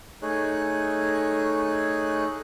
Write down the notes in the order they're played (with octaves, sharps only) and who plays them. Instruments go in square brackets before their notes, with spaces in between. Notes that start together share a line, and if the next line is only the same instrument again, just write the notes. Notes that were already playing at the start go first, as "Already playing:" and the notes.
[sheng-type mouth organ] A3 D#4 G#4 C#5 F#6